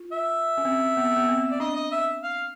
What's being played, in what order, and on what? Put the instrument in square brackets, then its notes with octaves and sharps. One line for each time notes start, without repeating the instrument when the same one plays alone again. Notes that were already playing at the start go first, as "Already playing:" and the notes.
Already playing: [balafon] F4
[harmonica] E5
[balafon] C#4
C4
B3
B3
C4
[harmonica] D5
[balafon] D4 [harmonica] D#5
[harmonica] D#5
E5
F5